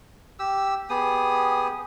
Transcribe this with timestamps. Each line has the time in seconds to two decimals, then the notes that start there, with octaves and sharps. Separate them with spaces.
0.39 G4 E6
0.90 B3 G4 G#4 D#6